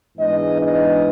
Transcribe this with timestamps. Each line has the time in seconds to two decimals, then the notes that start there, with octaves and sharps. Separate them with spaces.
0.17 G#2 E3 G#3 B3 D4 D#5
0.60 D#5